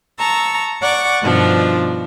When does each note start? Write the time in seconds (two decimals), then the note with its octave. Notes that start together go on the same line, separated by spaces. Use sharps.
0.19 A5 A#5 C#6 E6
0.81 D5 F#5 C#6 D6
1.21 G2 B2 D#3 F3 D4 F4